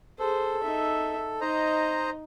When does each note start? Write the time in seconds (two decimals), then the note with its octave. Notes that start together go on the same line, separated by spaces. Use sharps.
0.19 G#4 A4 C5
0.63 D#4 E5
1.41 D#4 C5 D#5 A#5